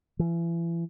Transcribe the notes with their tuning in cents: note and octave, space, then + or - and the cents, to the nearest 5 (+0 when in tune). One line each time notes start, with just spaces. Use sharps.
E3 +35